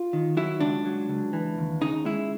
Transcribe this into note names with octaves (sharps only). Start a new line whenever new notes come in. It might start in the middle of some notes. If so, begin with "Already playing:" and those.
Already playing: F4
D#3
F#3 E4
C#2 D4
F#3
C#2
E3
D#2
C#3 D#4
G#3 E4